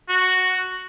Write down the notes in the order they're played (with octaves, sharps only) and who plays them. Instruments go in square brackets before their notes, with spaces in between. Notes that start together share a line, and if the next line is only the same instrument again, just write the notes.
[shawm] F#4